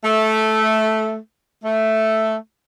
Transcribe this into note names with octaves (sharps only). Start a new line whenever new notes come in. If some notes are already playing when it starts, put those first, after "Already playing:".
A3
A3